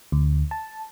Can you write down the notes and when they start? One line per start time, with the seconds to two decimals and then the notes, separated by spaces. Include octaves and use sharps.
0.12 D2
0.51 A5